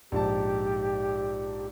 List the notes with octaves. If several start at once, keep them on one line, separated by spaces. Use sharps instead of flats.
A#1 G#2 G4 A5